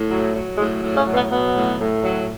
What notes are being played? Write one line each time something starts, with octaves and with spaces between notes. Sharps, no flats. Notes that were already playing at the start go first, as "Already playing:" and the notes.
Already playing: A2
F#3
F#3
A2 G#3
A2
C#3 C#4
F#3
B2 B3
B2 F#3 B3
A2
A2
F#3